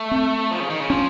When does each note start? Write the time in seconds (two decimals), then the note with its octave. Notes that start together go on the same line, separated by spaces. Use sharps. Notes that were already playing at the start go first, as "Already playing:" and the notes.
Already playing: A3
0.11 C4
0.51 F3
0.60 C#3
0.70 D#3
0.80 C#3
0.90 F3 C#4